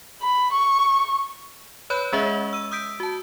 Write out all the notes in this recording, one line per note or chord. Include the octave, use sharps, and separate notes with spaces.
B5
C#6
B4 C#5 B5 F#6 G6
G#3 C#4 G#4 D#5 E5
E6 D#7
D#6 E6 G6 B6 D7
F#4 A5